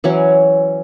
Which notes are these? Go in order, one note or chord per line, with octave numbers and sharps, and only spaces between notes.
E3 F#3 C#4